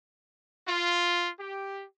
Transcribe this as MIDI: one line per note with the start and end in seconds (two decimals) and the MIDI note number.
0.66 1.27 65
1.37 1.82 67